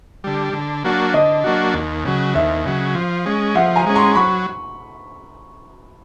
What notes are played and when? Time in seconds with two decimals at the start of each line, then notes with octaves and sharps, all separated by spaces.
0.24 D3 G3
0.53 D3
0.84 F#3 A#3 D4 F#4
1.14 D3 D#5
1.44 F#3 A#3 D4 F#4
1.74 D#2
2.05 C#3 F#3
2.35 D#2 E5
2.65 C#3 F#3
2.95 F3
3.26 G#3 C#4
3.55 F3 E5 F#5
3.76 G#5 A#5
3.86 G#3 C#4
3.95 A#5 C6
4.15 F#3 B5 C#6